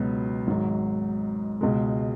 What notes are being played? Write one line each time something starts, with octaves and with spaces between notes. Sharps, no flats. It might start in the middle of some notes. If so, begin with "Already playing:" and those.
Already playing: C#2 B2 F#3 B3
G#1 G#2 F#3
C#2 B2 G#3